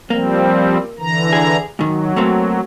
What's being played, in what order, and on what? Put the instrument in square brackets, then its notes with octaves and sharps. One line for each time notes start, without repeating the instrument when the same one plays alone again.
[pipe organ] F3 G3 C4 [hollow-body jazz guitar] A#3
[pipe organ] D3 E3 A#5
[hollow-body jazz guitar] G#4
[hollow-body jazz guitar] G#2 D#3 [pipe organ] F#3
[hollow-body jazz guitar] A3 A#3 C4